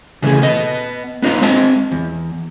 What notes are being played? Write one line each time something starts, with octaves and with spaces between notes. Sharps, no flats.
C#3 E3 G#3 A3 G#4
B3 D#5
B3 D4 D#4 F4 B4
G#3 C4 D#5 A5
E2